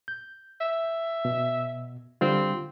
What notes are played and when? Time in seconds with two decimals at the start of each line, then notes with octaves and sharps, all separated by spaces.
0.08 G6
0.61 E5
1.25 B2
2.21 D3 G3 C4 F4